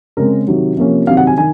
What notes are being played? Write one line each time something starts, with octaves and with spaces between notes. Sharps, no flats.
C#3 G#3 C4 A#4
C3 D#3 F#3
C3 F3 A#3 C#4
C3 D#3 F#3 C4 F5
F#5
G#5
D#3 G#5